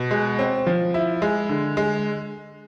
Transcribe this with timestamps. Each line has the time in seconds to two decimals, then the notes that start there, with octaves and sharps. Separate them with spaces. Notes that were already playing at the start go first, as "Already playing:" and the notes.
Already playing: B2
0.11 G#3
0.39 C4
0.67 F3
0.94 E4
1.22 G#3
1.49 D3
1.77 G#3